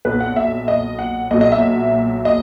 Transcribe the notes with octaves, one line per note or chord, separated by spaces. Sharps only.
B1 A#2 F#3 B4
F#5
E5
D#5
F#5
B1 A#2 F#3 D#5
D#5
E5
D#5